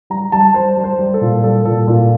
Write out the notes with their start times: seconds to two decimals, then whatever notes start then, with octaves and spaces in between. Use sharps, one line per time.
0.10 G3 A#5
0.32 G3 A5
0.54 G3 C5
0.77 G3
0.84 C5
0.99 G3
1.14 A4
1.21 A#2
1.44 G3 A4
1.65 A#2 A4
1.88 A#2